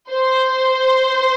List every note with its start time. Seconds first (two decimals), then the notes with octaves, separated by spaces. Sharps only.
0.11 C5